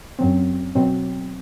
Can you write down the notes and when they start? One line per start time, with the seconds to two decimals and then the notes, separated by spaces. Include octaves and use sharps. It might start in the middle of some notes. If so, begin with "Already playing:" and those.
0.19 F#2 F#3 C4
0.75 B2 F#3 C4